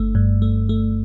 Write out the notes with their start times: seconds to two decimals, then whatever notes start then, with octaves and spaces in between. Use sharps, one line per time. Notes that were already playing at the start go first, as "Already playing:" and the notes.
Already playing: G1 A3
0.15 G2
0.42 A3
0.69 A3